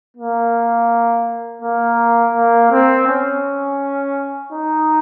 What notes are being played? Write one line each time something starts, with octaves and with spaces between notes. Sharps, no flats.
A#3
A#3
A#3
C4
C#4
D#4